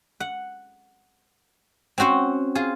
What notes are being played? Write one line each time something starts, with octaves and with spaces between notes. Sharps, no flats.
F#5
C4 C#4 F#4 C5 F#5
F4 G#4